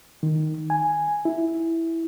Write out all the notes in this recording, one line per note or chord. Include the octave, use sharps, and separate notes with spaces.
D#3
G#5
E4